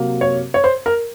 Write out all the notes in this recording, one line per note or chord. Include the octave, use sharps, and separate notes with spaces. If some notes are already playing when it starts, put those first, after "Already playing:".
Already playing: C3 F#3 A#3
C#5
C#5
C5
A#4